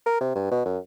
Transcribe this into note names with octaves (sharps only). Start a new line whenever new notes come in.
A#4
C3
G2
B2
F#2